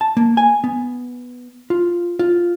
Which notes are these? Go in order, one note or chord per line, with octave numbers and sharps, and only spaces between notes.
A5
A#3
G#5
B3
F4
F4